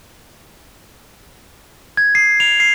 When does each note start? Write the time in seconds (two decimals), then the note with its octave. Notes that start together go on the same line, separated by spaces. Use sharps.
1.97 G#6
2.15 C7
2.40 F7
2.60 C7